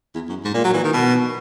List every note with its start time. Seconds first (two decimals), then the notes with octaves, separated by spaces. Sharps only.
0.15 E2
0.29 F#2
0.44 G#2
0.54 A#2
0.64 F#3
0.74 E3
0.84 D#3
0.93 B2